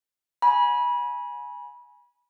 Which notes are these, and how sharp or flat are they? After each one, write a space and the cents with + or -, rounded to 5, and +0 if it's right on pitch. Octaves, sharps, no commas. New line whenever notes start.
G#5 +0 B5 -25